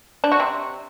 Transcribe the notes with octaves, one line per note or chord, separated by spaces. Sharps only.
D4
F#4
C3